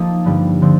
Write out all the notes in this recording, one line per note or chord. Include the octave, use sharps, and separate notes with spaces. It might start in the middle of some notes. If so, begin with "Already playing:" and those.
Already playing: F3 A#3 C4 D#4 A4
G2 D3 G3
D3 F3 C4